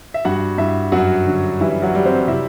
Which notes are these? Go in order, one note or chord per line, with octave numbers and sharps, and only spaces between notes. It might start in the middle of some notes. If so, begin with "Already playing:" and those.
E5
G2 F#4 F#5
G2 E4 E5
F#2 F#3 F#4
D3
E3 G3 E4
F#3 F#4
G3
C4 C5
C3 E4 E5